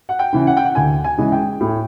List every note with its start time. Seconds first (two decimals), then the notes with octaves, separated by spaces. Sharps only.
0.09 F#5
0.19 G5
0.33 C#3 E3
0.47 F#5
0.57 G5
0.65 F#5
0.75 D2 G#5
1.04 G#5
1.18 C#3 E3 G#3
1.32 G5
1.60 A2